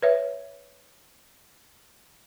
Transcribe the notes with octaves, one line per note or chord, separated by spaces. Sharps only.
B4 C#5 E5